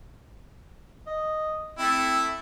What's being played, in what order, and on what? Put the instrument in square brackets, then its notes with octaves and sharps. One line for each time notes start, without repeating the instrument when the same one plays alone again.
[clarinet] D#5
[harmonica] A3 E4 [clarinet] C4